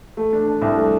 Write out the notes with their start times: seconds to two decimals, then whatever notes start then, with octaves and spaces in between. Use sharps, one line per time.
0.17 A3
0.33 D4
0.47 D4
0.62 C2
0.77 A3